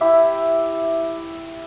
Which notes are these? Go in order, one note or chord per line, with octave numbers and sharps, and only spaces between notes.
E4 G4 E5